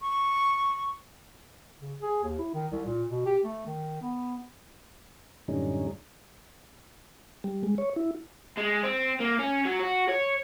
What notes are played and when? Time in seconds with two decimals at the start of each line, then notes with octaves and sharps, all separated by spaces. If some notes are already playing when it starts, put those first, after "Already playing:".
0.01 C#6
1.80 C#3
2.02 G#4
2.23 D#2
2.38 E4
2.54 D#3
2.72 C2
2.86 A#2
3.09 B2
3.26 G4
3.44 A3
3.66 D#3
4.02 B3
5.48 F#2 A2 D3 G3 C#4 D#4
7.44 G3
7.63 G#3
7.78 C#5
7.96 E4
8.58 G#3
8.84 C4
9.20 A#3
9.39 C#4
9.65 F#3
9.79 F#4
10.09 C#5